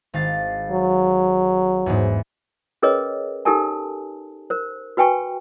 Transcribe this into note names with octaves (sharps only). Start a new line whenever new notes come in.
G#1 F5 A6
F#3
E2 G#2
C#4 G#4 A#4 B4 C#5 D#5
D#4 G4 A4 A#4 G#5 A5
A#4 C5
F#4 B4 G5 G#5 C#6